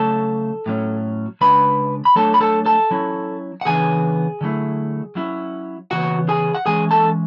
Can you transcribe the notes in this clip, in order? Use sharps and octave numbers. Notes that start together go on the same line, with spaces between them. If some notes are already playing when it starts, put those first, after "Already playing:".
Already playing: C#3 F#3 A3 A4 A5
A2 F#3 C#4
C#3 G#3 D4 B4 B5
B5
F#3 A3 D4 A4 A5
B5
A4 A5
A4 A5
F#3 C#4 E4
F#5
C#3 E3 B3 D4 G#4 G#5
D3 F#3 A3 E4
F#3 C#4 E4
C#3 E3 B3 F#4 F#5
G#4 G#5
F#5
E3 G#3 C#4 G#4 G#5
A4 A5